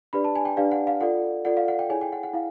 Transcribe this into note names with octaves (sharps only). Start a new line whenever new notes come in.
D4 G4 B4 D5 B5
A5
G#5
G5
D4 G4 B4 D5 F5
F#5
F5
F4 A4 D5 F#5
F4 A4 D5 F#5
F5
F#5
G5
E4 G#4 C#5 G#5
G5
F#5
F#5
E4 F5